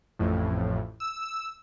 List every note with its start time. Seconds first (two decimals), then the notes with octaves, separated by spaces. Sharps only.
0.19 A1 F2 A2
1.00 E6